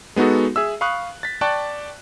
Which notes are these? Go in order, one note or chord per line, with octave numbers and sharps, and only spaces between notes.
G#3 B3 D#4 F#4 A4
G#4 E5 E6
F5 B5 C#6 D#6 F#6
A6 B6
D5 G5 A5 C#6 D6 F#6